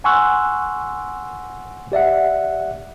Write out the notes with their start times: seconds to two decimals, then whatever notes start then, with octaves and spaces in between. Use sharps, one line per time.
0.04 F#5 G#5 C6 C#6 E6 F#6
1.92 G4 D5 E5 F#5